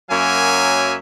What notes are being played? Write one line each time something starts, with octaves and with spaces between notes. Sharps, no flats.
F#2 F#3 A#3 C#5 E5 G#5